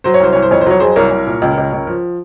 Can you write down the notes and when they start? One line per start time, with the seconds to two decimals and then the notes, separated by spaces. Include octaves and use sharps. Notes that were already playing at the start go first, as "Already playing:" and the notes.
0.04 F#3 C5
0.14 C#5
0.20 C2 C5
0.33 C2 C#5
0.42 C5
0.51 F2 C#5
0.61 C5
0.66 F#3 C#5
0.80 F#3 G#4 C5
0.96 C2 A#4 C#5
1.11 C2
1.27 A#2
1.42 C#2
1.58 C#2
1.73 C#2
1.87 F3